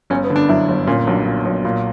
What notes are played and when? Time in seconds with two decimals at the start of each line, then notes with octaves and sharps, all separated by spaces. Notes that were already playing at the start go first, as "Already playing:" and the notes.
0.10 G1 C#4
0.24 B3
0.30 D3
0.36 D4
0.49 F#2 E4
0.68 G1
0.87 A#2 C#4
1.07 B1 D4
1.26 A#2
1.45 B1
1.65 A#2